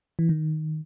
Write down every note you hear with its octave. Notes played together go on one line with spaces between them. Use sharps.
E3
D#3